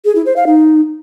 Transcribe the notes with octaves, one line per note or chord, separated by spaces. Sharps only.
G#4
E4
C5
F5
D#4